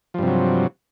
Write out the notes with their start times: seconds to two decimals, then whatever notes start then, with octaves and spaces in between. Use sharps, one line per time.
0.14 F3
0.19 G2
0.23 C3
0.27 F#3